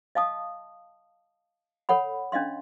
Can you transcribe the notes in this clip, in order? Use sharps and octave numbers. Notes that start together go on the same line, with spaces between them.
D#5 F5 A5 D#6
A4 C#5 F#5 B5
C#4 D4 D#5 F5 C6